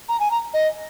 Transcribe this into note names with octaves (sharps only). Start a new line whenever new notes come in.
A#5
G#5
A#5
D#5